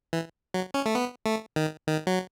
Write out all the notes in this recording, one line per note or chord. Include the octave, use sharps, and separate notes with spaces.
E3
F#3
C#4
A3
B3
A3
D#3
D#3
F#3